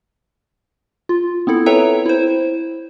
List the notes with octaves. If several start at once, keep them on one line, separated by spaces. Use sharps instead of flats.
F4
B3 C4 E4 A4
A4 B4 C#5 E5 G5 A#5
E4 C5